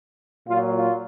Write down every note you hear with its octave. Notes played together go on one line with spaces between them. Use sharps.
A#2 F#3 F4
F4